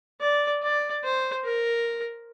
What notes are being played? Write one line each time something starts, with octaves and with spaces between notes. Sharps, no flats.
D5
D5
C5
A#4